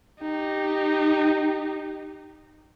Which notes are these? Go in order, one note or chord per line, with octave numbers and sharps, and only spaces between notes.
D#4 G4